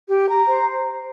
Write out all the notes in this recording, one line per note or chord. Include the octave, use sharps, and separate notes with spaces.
G4
A#5
C5